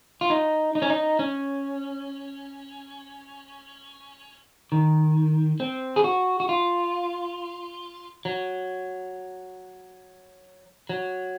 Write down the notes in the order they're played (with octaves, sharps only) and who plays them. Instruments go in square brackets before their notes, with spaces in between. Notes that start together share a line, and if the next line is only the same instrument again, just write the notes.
[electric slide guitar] F4
D#4
D#4
C#4
D#4
C#4
D#3
C4
G#4
F#4
F#4
F4
F#3
F#3